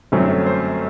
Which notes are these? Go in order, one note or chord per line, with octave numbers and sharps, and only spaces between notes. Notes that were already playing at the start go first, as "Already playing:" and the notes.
G1 F#2 F#3 A3 C4
C5